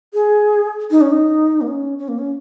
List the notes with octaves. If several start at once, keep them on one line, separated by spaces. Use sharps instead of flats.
G#4
D#4
C#4
D#4
A#3
C#4
C#4
A#3
C#4